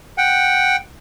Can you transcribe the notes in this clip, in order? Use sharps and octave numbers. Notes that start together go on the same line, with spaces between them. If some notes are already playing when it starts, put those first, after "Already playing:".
F#5 G5